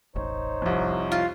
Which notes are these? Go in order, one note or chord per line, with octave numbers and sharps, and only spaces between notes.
E1 A1 D#4 C5 C#5
C2 F2
F4